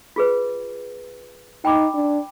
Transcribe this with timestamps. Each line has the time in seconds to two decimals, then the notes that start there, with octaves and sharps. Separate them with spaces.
0.16 F4 G#4 B4
1.65 D#4 G5 B5 D6
1.94 D4